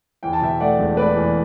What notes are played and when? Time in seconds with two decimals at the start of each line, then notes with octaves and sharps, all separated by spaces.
0.23 E2 G5
0.33 A5
0.41 B2 E5 G5
0.60 A3 D5 F#5
0.79 E1
0.97 A3 B4 D5
1.16 E2